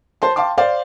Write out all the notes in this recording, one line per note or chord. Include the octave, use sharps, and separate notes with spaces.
C5 A5 C6
F5 G5 A5 C6 D6
C5 D5 F5